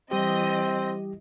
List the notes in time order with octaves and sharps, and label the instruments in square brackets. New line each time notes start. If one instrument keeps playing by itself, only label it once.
[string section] E3 D#5 [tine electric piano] G3 G4 [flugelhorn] C4